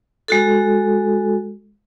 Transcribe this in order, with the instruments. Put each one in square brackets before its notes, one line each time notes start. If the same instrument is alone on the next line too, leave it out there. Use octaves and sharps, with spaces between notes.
[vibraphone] G#3 F#4 A4